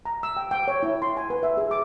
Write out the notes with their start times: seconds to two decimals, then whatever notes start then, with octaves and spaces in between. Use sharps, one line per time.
0.05 A#5
0.23 E6
0.37 G5
0.51 G5
0.68 C#5
0.83 E4
1.02 C6
1.17 G#5
1.30 B4
1.43 E5
1.57 G#4
1.71 D6